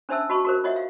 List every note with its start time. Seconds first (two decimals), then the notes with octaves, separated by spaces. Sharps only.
0.09 C#4 D4 C5 E5 A5 E6
0.29 F#4 D#5 A5 B5 C#6
0.45 F#4 A#4 C5
0.64 F4 C#5 D#5 E5 F#5
0.76 F5